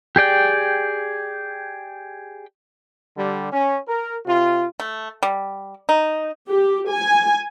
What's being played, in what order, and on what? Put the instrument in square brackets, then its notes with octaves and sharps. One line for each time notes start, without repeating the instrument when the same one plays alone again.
[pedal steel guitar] G4 G#4 D5 G5
[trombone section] D3 G3
C#4
A#4
C3 F4
[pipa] A3
G3
D#4
[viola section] G4
G#5